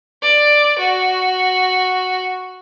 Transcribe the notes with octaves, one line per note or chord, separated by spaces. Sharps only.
D5
F#4